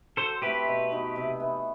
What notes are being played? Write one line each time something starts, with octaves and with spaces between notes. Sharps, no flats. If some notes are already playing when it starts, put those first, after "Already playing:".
F#3 A4 C5
A3 C4 E4 G4 B4
B2
F#3 B3 D#4
C3
E3 B3